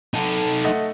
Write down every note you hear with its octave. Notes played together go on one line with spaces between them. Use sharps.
D#4 A4
A3 D#5 F#5